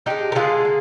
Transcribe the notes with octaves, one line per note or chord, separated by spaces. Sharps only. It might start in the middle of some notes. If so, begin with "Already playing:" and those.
D3 G#3 D#4 G4
A#4
D3 G#3 F4 G#4
A#3